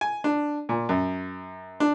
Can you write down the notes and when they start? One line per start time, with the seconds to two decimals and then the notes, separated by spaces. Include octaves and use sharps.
0.01 G#5
0.24 D4
0.69 A#2
0.89 F#2
1.80 D4